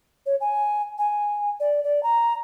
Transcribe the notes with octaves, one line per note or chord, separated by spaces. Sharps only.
C#5
G#5
G#5
D5
D5
A#5